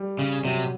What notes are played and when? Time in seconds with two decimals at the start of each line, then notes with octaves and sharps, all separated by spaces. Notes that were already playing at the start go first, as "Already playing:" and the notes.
Already playing: G3
0.19 C#3
0.45 C3 F#3